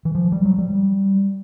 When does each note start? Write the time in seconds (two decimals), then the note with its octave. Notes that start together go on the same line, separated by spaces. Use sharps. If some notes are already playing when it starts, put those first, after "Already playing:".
0.05 E3
0.15 F3
0.32 G3
0.45 F#3
0.58 G3